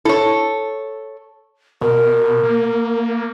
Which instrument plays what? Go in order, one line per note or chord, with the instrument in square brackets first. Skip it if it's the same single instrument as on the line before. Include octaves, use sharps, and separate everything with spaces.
[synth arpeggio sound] E4 [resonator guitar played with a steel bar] A4 C#5
[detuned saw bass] B2 [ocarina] A#4
[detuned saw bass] A#3